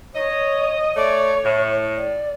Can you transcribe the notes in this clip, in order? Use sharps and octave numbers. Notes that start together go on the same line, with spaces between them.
C#5 D#5
A3 C#5 D5
A2
D5